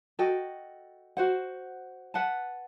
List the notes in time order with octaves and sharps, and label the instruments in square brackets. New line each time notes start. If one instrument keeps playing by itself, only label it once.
[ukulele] F#4 A4 D#5 G5
F#4 C5 F#5
B4 F#5 A5